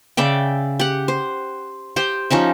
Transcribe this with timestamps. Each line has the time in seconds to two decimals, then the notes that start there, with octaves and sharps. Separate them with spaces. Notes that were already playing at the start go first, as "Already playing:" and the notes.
0.17 C#3 D5 E5 G5
0.79 G4 F#5
1.08 C5
1.96 G4 C5 G5
2.30 F3 C#4 D#4 E5